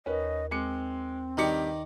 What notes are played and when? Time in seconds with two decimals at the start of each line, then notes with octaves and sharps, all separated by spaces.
0.06 D#2 C#4 A#4 B4 D#5
0.51 G#3 C4 D6 C#7
1.37 G2 D#3 D#4 G4 D5 C#7